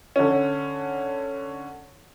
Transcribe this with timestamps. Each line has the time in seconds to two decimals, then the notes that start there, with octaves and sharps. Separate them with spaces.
0.16 D3 C#4